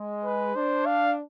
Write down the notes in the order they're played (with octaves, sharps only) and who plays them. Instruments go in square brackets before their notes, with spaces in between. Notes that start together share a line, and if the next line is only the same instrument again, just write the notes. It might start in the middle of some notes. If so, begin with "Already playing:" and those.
Already playing: [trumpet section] G#3
[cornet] B4
[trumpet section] D4 [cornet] C5
[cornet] F5